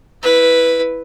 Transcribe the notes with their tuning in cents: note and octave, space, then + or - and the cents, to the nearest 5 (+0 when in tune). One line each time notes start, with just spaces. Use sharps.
E4 +0 B4 +0